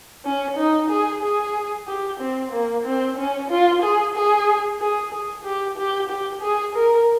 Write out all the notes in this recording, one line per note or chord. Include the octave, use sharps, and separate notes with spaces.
C#4
D#4
G#4
G#4
G4
C4
A#3
C4
C#4
F4
G#4
G#4
G#4
G#4
G4
G4
G4
G#4
A#4